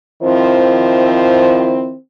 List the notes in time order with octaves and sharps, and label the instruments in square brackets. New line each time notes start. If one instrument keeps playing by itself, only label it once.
[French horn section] D#3 F3 C4 E4 C5